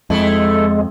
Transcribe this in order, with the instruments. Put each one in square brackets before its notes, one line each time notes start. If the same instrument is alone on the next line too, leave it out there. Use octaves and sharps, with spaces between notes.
[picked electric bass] F2 [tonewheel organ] G#3 [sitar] A3 E4